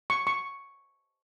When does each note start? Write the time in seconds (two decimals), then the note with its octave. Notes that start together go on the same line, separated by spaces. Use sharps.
0.10 C#6
0.27 C#6